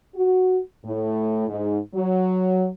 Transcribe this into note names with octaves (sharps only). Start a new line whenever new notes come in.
F#4
A2
G#2
F#3